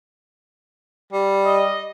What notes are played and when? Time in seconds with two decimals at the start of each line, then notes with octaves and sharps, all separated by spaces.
1.13 G3
1.46 D#5